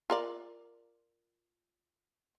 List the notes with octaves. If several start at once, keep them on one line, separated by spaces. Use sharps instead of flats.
F4 A#4 D5